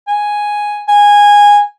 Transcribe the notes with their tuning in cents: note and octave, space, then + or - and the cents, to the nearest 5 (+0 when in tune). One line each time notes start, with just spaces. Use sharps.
G#5 +0
G#5 -15